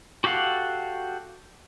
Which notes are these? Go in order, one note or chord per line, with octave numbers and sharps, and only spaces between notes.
F#4 G4 A4 F5 F#5